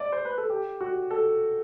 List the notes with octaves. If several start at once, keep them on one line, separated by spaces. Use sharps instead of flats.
D5
C5
B4
A4
G4
F#4
A4